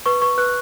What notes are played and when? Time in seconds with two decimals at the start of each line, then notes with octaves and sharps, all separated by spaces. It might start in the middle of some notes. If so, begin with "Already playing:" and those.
0.06 B4 C#6
0.22 B4 C#6
0.38 B4 F#6